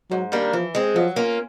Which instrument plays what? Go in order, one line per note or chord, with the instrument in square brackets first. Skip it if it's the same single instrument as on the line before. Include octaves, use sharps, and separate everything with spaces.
[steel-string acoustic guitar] G#2 [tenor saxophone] F#3
[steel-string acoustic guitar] D#3 G3 A#3 D4
[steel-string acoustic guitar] E3 [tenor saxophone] F3
[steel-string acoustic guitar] G#3 C4
[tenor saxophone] F3 [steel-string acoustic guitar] F#3
[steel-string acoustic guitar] A#3 C#4 F4